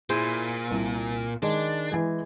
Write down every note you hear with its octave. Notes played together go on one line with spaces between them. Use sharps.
A#2 E4 G#4 C5
C2
D#3 G#3 D4
E3 G#3 G#4